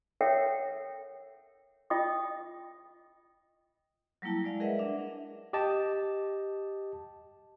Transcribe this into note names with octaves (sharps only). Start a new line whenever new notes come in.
A4 A#4 C#5 E5 F#5 G5
F4 D#5 G5 D#6
F#3 G3 A#3 E4 A5
G#3 D5 F5
G#4 A#4 B4 D#5 E5 F#5
D4 E5
G4 D#5 A5